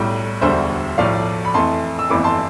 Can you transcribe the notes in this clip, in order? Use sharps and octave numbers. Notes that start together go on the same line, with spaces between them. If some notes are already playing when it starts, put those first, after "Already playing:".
Already playing: B1 A2 G3
E1 D2 D3 G3 C5 E5
B1 A2 F3 A3 D5 F5
B5
F2 E3 A3 A5 C6
E6
G1 F2 E3 A3 B5 D6
A5 C6